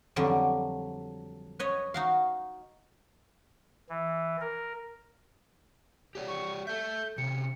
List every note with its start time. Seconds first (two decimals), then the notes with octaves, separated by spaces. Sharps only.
0.16 F2 D3 F#3 G3
1.59 B4 C#5 D#5
1.94 D#4 F#4 F5
3.89 E3
4.41 A#4
6.15 G4 C#5 D5
6.28 C#6
6.67 A4 E5 G6
7.18 C3 C#4 C#7